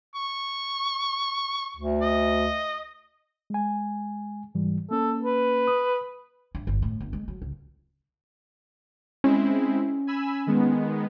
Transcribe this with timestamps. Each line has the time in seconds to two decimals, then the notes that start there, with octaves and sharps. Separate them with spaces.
0.15 C#6
1.77 D2
2.02 D#5
3.50 G#3 G#5
4.55 G#2 E3 G3
4.91 A#3 C#4 A4
5.22 B4
5.68 D#6
6.55 G2
6.67 G1
6.82 A2
7.01 G1
7.13 G#3
7.28 F#3
7.42 C#2
9.24 G#3 C4 C#4 E4
10.07 G#5 B5 E6
10.47 D#3 G#3 B3